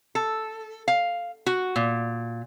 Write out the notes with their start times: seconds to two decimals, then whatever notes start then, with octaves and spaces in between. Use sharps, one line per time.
0.15 A4
0.88 F5
1.46 F#4
1.76 A#2